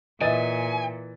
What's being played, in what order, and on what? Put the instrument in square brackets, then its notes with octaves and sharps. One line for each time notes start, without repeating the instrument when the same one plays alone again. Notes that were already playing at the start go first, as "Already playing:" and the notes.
[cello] A#2 [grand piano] E3 A6 D#7 [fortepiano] D#5 E5 [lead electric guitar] G#5